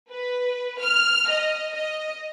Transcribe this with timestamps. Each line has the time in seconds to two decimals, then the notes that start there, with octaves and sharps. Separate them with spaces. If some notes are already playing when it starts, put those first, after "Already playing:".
0.10 B4
0.80 F6
1.29 D#5
1.73 D#5